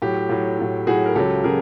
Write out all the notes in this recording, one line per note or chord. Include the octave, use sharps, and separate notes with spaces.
A2 F#3 G4
A2 F#3
A2 F#3
A2 F#3 F#4 G#4
A#4
C#2 C#3 F#3 G4 A4
C#3 F#3 G#4 A#4